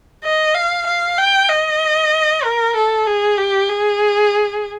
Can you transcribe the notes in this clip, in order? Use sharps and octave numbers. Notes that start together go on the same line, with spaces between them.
D#5
F5
F5
G5
D#5
A#4
A4
G#4
G4
G#4